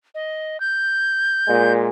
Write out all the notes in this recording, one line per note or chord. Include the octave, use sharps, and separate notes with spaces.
D#5
G6
A#2 G#3